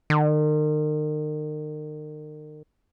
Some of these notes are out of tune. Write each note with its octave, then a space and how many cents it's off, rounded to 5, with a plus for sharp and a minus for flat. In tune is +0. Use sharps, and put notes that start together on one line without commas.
D#3 -40